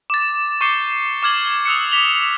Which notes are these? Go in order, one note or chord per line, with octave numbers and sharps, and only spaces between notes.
D6 A6
C#6 D6 G6 C7 C#7 G7
D6 F6 G#6 F#7
D#6 E6 F#6 C#7
D6 B6 F7 G7